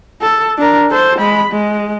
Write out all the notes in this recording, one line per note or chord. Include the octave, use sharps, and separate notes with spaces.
A4
D4 A#4
A4 C5
G#3 B5
G#3